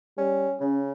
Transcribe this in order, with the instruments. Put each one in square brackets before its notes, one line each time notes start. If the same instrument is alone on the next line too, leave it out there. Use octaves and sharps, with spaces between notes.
[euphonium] G3 [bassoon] C#4
[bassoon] C#3 [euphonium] C#4